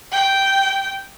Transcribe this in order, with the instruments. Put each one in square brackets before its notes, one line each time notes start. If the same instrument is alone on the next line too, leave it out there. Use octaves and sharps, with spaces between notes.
[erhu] G5